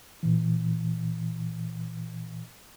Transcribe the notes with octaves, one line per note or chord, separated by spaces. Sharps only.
A#2 E3